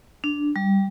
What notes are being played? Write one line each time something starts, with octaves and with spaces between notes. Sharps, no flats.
D4
G3